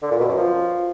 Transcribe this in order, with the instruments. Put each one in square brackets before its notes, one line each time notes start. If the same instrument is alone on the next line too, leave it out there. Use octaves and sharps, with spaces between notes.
[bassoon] D3
A#2
B2
F#2
F3